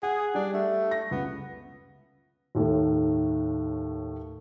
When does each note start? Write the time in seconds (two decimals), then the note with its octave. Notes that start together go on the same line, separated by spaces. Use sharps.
0.03 G#4 F#5
0.35 G3 D4
0.54 A3
0.91 A#6
1.11 C#2 B3
2.55 D#2 A2 D#3 A3